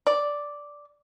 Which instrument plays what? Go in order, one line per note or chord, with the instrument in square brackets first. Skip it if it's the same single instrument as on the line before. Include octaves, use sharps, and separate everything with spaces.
[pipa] D5